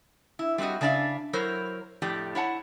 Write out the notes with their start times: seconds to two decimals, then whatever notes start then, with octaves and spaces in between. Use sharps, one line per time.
0.39 E4
0.58 G3 C4 D4 F#4 D#5
0.81 C#3 D4 D5 E5 F5
1.33 F#3 E4 A#4 C5 C#5
2.02 F2 A2 F3 G4 D5 G5
2.35 E4 C#5 F#5 A5